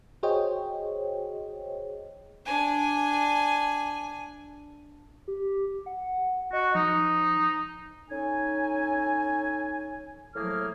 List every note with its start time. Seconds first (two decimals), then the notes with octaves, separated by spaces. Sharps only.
0.23 F#4 G#4 C5 C#5 D#5 G5
2.45 D4 G#5
5.28 G4
5.86 F#5
6.53 F#4 D#5
6.75 F3 D#4
8.10 C#4 D#4 A4 G#5
10.35 A2 F3 F#3 A#3 G#4 F6